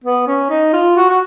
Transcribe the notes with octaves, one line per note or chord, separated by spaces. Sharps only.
B3
C#4
D#4
F4
F#4
F#4